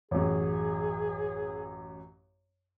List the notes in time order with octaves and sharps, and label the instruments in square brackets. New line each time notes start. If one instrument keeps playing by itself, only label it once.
[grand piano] A1 F#2 [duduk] G#4